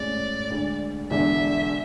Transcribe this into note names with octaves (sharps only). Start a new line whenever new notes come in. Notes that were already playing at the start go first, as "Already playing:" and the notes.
Already playing: A2 G#3 C#4 D5
D2 D3 G#3
E1 E2 D3 G#3 D4 E5